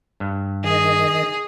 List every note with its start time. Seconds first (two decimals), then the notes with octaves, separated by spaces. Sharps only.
0.20 G2
0.64 D#3 G#4 D#5